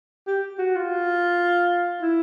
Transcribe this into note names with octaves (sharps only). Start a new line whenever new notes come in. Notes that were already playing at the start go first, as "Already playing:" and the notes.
G4
F#4
F4
E4